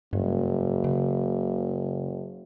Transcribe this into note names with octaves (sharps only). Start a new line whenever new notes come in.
F#1 G2
C#3